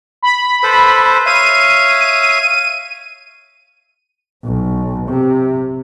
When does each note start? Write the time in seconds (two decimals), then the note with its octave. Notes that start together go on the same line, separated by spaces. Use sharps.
0.22 B5
0.63 A4 B4 C5
1.26 C#5 E5 F5 D#7
4.44 B1
5.08 C3